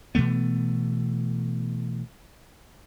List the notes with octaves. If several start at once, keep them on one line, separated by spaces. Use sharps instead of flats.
B2 E3 A3 B3